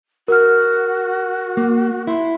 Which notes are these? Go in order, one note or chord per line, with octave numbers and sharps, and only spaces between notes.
F#4 A#4 F6
A#3
E4 C6